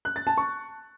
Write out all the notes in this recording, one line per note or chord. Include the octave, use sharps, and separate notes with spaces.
F#6
A6
A5
C#6